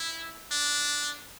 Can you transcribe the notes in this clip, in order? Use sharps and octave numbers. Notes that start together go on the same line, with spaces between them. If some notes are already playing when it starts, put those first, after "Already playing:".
Already playing: E4
D4